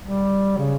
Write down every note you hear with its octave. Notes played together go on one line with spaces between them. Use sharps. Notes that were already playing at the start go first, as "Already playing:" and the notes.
G3
C#3